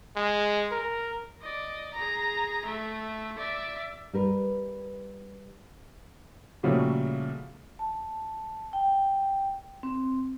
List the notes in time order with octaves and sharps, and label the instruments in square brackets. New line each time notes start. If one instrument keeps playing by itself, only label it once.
[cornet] G#3
A#4
[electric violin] D5 D#5
G#4 A#5
A3 E5
D5 E5
[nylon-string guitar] G3 A#4 B4
[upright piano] A#2 C#3 F3 G3 A3 F#4
[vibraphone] A5
G5
C4